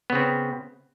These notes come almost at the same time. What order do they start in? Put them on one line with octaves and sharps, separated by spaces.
B3 C#3 C4